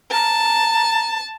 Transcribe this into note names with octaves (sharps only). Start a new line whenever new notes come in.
A5 A#5